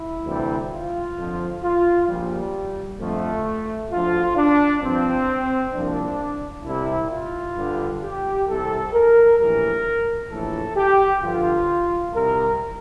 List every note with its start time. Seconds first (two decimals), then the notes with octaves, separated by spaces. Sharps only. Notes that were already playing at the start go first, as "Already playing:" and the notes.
Already playing: E4
0.25 D2 C3 E3 G3
0.71 F4
1.17 F2 D3 F3
1.62 F4
2.08 A#1 A#2 F3 G3
2.99 F2 D3 F3 A3
3.91 D2 D3 F3 F4
4.37 D4
4.82 G2 F3 C4
5.73 C2 A#2 F3 D4
6.65 C2 C3 G3 E4
7.11 F4
7.57 G2 D3 G3
8.02 G4
8.48 C2 C3 G3 A4
8.93 A#4
9.39 A#1 A2 E3 G3 A#4
10.30 A#1 A2 E3 A4
10.76 G4
11.22 G2 D3 F3 F4
12.14 C2 C3 G3 A#4